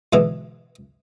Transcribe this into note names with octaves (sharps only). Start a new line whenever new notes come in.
G#2 B2 D3 E3